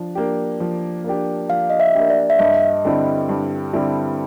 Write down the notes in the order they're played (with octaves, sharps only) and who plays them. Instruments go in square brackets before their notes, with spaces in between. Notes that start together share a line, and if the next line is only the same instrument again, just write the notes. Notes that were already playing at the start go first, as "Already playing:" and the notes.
Already playing: [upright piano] F3 D4
A#3 D4 G4
F3
A#3 D4 G4
[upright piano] F3 [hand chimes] F5
[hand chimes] D#5
E5
[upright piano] A#3 D4 G4
[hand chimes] D5
E5
[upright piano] G2 [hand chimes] D#5
[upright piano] D3 G3 C4 E4
G2
D3 G3 C4 E4